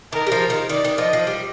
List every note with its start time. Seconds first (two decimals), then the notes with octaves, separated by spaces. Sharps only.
0.12 D#3 A#4
0.27 G3
0.32 F3
0.50 D#3
0.69 D#3 D5
0.84 D#3
0.98 F3 D#5
1.13 F3
1.27 G3